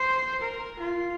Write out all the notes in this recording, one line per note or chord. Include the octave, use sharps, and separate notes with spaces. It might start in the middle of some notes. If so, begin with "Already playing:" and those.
Already playing: C5
A#4
F4